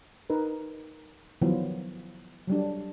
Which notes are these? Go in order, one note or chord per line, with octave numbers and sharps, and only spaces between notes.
D#4 A#4 B4
D#3 F3 F#3 B3 E4
F#3 G3 D4